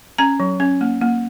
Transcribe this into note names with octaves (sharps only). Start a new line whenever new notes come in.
C#4 A#5
F#3
C#4
A#3
A#3